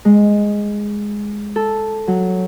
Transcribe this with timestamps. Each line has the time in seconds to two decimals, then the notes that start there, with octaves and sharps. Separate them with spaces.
0.05 G#3
1.56 A4
2.07 F#3